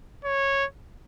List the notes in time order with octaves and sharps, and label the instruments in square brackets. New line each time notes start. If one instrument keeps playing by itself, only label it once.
[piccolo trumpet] C#5